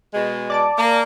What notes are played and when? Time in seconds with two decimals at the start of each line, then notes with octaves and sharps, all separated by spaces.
0.14 B2 G#3
0.50 D5 A5 D6
0.78 A#3